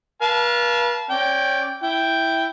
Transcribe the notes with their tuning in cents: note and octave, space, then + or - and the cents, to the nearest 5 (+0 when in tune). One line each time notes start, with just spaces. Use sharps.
B4 -45 F5 -20 A5 -15
C#4 -30 D5 -20 G5 +0
E4 +0 G5 +0